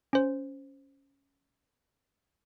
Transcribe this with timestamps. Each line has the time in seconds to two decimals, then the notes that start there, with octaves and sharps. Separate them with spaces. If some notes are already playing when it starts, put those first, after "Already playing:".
0.13 C#4 C5